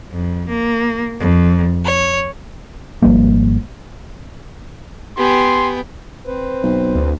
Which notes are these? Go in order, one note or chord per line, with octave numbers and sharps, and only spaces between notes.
F2
A#3
F2
C#5
G#1 F3 G3 A#3
B3 G4 G5 G#5 C6
C4 B4 C5
B1
D2